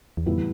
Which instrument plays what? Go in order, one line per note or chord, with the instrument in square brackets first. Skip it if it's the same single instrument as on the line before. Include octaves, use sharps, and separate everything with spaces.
[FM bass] E2
[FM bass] F2 [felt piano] A2 E3 G3 B3 E4